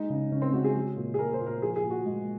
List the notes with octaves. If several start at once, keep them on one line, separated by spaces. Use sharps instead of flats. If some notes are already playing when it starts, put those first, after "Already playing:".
Already playing: G#3 D#4
C#3
C#3 C#4
C4
G#3 F#4
G#4
F#3
A#2
G#4
A#3 A#4
C5
A#2
A#4
F3 G#4
G#4
A#2
F#4
G#3